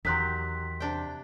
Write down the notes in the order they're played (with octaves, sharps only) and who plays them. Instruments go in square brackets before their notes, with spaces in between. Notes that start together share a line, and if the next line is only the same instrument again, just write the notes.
[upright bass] E2 [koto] D#3 F#3 G4 [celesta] C6 F#6 B6
[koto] C3 D4 G5